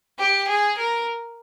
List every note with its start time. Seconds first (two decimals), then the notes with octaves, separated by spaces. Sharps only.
0.19 G4
0.48 G#4
0.77 A#4